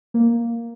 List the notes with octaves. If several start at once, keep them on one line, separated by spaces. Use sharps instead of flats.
A#3